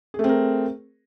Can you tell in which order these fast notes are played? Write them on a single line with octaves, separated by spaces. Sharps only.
G#4 A3 C4 A#4